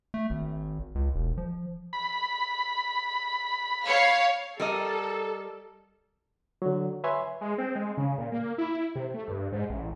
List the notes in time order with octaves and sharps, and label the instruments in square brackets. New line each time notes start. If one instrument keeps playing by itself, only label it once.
[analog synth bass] A3
G#1
C#2
E1
F3
[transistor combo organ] B5
[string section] C#5 F5
[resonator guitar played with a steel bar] G3 A#4 D#5 [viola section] A4
[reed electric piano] D3 F#3
B4 C#5 E5 G#5 C6
[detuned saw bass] G#3
C4
G#3
C#3
A#2
A#3
E4
C3
A3
G2
G#2
A1